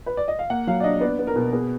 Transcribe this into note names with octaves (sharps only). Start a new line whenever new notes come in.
B4
D5
D#5
F5
A#3 F#5
F#3 F5
D5
D4 D#5
B3 D5
B3
A#4
B2
B3 G#4